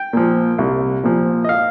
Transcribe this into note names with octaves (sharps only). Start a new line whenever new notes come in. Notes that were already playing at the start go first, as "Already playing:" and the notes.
Already playing: G5
A#2 F3
C2
A#2 F3
D#5
F5